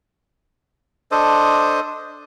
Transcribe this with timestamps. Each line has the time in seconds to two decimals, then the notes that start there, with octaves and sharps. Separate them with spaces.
1.11 D4 A4 C5 D#5